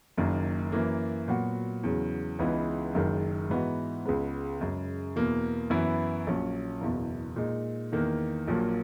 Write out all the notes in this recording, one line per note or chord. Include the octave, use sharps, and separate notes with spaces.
F#1 F#2 D#3 A#3
F#2 E3 A#3
A#2 F#3 B3 F#4
E2 C#3 F#3
C#2 C#3 E3 B3 D#4
F#1 F#2 D#3 G#3
G#2 E3 B3 D#4 F#4
C#2 C#3 G#3 B3
F#2 C#3 G#3
E2 B2 A#3
F#2 E3 B3 E4
A#1 A#2 F#3 C#4
F#1 E2 B2
A#2 G#3 D#4
E2 D#3 A#3
A#1 A#2 F#3 A#3